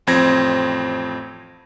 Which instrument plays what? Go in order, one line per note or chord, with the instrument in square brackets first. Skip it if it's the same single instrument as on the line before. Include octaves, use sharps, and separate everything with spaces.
[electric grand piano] A1 F2 C4 G#6 A#6